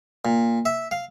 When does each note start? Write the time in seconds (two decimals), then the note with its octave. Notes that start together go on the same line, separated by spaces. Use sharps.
0.25 A#2
0.65 E5
0.91 F5